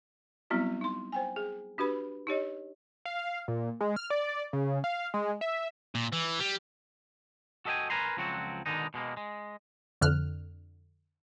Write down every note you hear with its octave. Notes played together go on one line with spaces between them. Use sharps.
F#3 G3 B3 C4 E4 F#4
D#4 C6
C5 G5 G#5
G#4
D4 F#4 G4 B4 B5
D#4 G4 C#5 D#5
F5
A#2
G#3
F6
D5
C#3
F5
G#3
E5
A#2
E3
G3
F#4 A4 D#5 E5 G5 G#5
A#4 B4 G#5 A#5 C6
C#2 F3 F#3 C4 F#4
B2 D3 D#3 G#3 D#4
B2 G#3 A#3
G#3
F2 D3 F6 F#6